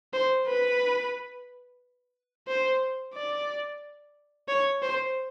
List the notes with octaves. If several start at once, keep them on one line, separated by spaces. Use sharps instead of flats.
C5
B4
C5
D5
C#5
C5